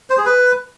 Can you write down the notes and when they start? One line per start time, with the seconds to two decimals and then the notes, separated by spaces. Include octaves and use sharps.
0.10 C5
0.18 G#4
0.26 B4